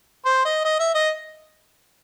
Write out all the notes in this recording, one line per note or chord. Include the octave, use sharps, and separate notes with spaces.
C5
D#5
D#5
E5
D#5